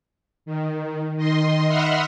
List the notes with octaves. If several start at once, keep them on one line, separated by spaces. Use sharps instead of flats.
D#3
D#3 D#5 C6
D#5 E5 F#5 B5 C6 F6